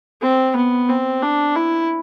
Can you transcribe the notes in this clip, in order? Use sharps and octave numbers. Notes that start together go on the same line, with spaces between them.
C4
B3
C4
D4
E4